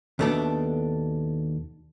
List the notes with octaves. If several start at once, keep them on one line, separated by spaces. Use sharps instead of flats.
D#2 B2 A3 B3 D4 A4